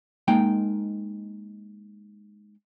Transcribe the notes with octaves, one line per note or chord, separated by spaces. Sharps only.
G#3 A#3 D#4 G5